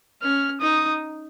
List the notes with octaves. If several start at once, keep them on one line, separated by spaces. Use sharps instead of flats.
C#4 F6
D#4 D#6